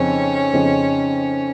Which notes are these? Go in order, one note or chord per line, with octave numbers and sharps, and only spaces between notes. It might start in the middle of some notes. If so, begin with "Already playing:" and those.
Already playing: F2 C#3 F3 C4 C#4 D#4
F2 C#3 F3 C4 D#4